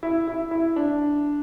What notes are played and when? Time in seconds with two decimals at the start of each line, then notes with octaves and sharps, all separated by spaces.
0.03 E4
0.27 E4
0.51 E4
0.76 D4